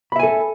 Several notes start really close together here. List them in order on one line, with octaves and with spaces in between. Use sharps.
B5 E5 G#5 A4